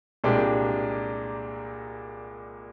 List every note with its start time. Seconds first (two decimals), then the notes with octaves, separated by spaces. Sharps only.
0.24 C2 A#2 G#3 D4 G4